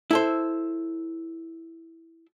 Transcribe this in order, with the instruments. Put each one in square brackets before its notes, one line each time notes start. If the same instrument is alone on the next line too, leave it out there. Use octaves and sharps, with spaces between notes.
[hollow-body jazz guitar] E4 A4 C5